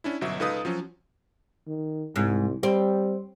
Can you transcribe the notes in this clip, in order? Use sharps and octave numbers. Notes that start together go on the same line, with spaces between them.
C#4 D4 E4
G1 B2 F#3 E5
C#2 D#4 A4 B4 F5 D#6
F3 F#3 C#4
D#3
C2 G#2
G3 C4